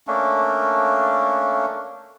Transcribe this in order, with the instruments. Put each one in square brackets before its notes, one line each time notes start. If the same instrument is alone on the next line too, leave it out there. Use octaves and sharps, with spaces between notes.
[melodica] A3 A#3 C#4 D4